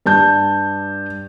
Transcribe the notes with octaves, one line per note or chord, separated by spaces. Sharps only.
G2 A5 G6